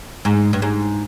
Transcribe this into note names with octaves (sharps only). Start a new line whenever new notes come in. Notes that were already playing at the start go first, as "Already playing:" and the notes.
G#2
G2
G#2